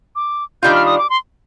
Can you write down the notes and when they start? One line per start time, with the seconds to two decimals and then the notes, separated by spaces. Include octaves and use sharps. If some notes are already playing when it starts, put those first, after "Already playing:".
0.16 D6
0.63 D#3 G3 D4 F4 G6
0.75 F6
0.86 D#6
0.98 D6
1.10 C6